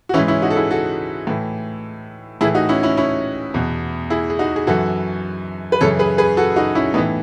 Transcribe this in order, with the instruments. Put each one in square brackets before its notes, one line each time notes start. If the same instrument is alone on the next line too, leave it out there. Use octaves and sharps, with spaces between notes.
[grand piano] F#4
E3 C#4 E4
G#2
C#4 E4
D#4 F#4
A4
E4 G#4
F#4 A4
A2 E3
A2 E4 G#4
E3
D#4 F#4
C#4 E4
C#4 E4
C#4 E4
E2 B2
E4 G#4
G#4
D#4 F#4
G#4
F#2 E3 F#4 A4
B4
F#2 C#3 E3 A4 C#5
G#4 B4
G#4 B4
F#4 A4
D#4 F#4
C#4 E4
A2 E3 B3 D#4